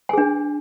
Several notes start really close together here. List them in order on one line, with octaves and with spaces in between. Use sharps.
G#5 G#4 D4